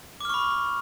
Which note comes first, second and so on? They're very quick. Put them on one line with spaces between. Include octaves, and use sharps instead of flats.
D6 F6 C#6 B5